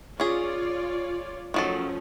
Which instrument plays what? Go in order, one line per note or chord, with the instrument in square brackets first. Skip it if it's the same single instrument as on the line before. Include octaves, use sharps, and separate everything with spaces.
[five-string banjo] C#4 G#4 [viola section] F4 C#5 D5
[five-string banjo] D#3 F#3 A4 [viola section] F3 A3 C#4